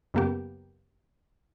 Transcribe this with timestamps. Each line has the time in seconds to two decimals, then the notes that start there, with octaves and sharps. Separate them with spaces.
0.14 F#2 C#3 A#3 B3 G4